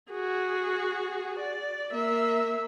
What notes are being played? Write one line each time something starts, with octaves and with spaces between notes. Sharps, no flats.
F#4 G#4
D5
A#3 E5